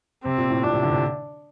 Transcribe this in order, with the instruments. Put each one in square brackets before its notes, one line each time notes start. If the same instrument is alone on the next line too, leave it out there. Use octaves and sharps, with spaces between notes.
[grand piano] C3 [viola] C4
[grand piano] A#2
A2
[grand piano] A#2 [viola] D4
[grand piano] C3
D3
C3